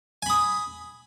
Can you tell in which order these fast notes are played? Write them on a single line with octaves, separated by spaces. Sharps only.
G#5 B5 D#6